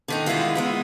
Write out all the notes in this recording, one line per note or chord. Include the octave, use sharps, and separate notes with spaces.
D3 D#3 D#4
D3 D#3 G#3 E4 F4
E3 G#3 B3